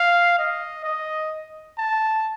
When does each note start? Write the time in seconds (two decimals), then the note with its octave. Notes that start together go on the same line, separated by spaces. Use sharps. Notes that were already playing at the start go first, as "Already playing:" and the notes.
Already playing: F5
0.38 D#5
0.84 D#5
1.78 A5